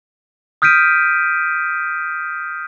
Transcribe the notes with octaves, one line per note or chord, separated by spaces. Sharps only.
D#6 F6 G6 B6 D7 D#7